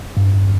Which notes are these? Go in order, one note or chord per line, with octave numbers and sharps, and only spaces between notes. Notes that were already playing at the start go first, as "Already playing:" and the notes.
G2